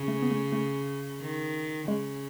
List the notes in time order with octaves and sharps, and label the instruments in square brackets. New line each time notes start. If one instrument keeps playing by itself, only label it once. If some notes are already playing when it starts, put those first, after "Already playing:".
Already playing: [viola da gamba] C#3
[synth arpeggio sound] A3
B3
A3
A3
[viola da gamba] D#3
[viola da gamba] C#3 [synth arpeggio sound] G#3